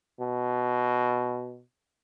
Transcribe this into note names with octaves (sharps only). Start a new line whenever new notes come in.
B2